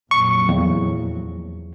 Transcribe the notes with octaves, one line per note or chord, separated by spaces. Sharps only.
F2 A#2 F#3 C#6
E2